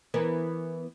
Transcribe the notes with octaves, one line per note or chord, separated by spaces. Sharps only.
E3 B3 A#4